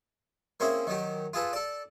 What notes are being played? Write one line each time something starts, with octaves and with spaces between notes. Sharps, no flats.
A#3 C4 C#4 E4 G#4
D#3 F#3 G4
F4 G#4 A4 B4
A4 D5